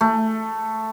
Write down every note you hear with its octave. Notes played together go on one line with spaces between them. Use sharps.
A3